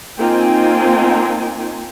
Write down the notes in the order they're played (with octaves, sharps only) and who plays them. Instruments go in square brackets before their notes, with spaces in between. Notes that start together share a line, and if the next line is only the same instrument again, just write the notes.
[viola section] A#3 C4 D#4 F4 G5 G#5